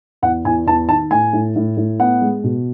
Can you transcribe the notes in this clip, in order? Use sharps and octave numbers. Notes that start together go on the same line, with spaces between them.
E2 F#5
E2 G#5
E2 A5
D#3 A5
A2 G#5
A2
A2
A2
B3 F#5
G#3
B2